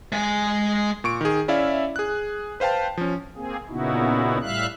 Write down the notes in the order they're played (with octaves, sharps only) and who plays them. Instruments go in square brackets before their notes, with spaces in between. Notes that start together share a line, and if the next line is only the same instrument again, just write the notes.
[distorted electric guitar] G#3 G#5
[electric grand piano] A#2 C#6 D7
D#3 G#4
C#4 E4 D5 E5 F5
G#4 F#6
B4 C5 F5 G5 A5
F3 C#4
[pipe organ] A#3 C4 G#4
A#2 C#3 B3 D#4 E4 F#4
A2 G3 E5 F5 F#6